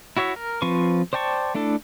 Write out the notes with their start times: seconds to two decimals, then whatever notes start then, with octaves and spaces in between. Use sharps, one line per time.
0.17 E4 F#4 C#5 E5
0.36 A#4
0.62 F3 C4 F4 B4 C#6
1.13 C5 D5 G5 A5 C#6
1.55 A3 D4 E4 A4